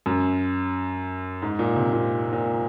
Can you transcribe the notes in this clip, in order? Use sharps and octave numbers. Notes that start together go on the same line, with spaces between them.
F#2
G#2
A#2
C3
A#2
A#2